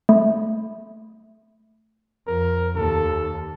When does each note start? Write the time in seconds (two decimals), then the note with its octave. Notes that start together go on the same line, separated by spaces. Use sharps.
0.09 A3
2.27 F2 A#4
2.76 D#2 A4